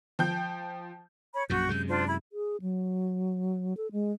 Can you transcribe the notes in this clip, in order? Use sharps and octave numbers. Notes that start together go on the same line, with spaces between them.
F3 G5 G6
C#5 B5
A#1 F#2 A#2 F#4 G6
F#2 C3 G#3 G6
D4 F4 C5
E4 B5
G#4
F#3
A4
G#3